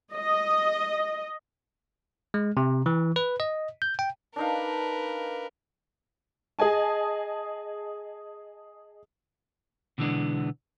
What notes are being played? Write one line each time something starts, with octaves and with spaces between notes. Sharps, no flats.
D#5
G#3
C3
E3
B4
D#5
G6
G5
D4 D#4 A#4 B4 F5
G#4 D#5 G#5 A5
B2 D3 E3 G#3 B3 D4